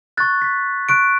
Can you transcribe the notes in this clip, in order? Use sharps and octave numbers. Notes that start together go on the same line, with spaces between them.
C#6 F#6 A6
B6
C#6 F#6 D7